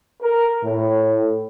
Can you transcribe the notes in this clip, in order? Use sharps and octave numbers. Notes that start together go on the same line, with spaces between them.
A#4
A2